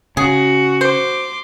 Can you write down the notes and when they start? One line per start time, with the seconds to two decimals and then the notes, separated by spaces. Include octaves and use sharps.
0.17 C#3 F#4 G#4
0.81 C5 C6 D6